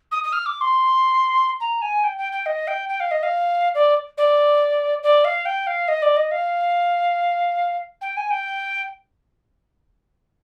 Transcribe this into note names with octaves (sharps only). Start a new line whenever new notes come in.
D#6
D#6
F6
D6
C6
A#5
G#5
G5
G5
G5
D#5
G5
G5
F5
D#5
F5
D5
D5
D5
F5
G5
F5
D#5
D5
D#5
F5
G5
G#5
G5